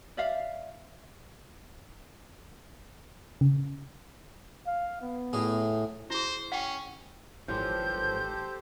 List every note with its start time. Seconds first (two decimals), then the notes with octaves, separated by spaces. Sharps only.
0.17 D5 E5 F5
3.41 C#3
4.67 F5
5.02 B3
5.33 A2 G#4
6.10 E4 G#4 C5
6.52 C#4 F#5 G5
7.48 G#1 F#2 E3 F3 G4 A4 C5 G6